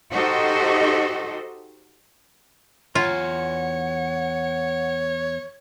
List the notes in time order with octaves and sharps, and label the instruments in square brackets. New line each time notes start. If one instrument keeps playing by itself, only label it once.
[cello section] D#4 F#4 G4 A4 C5 D#5
[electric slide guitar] E2 G#5 A#5 [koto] F4 [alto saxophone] C#5 [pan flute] F#5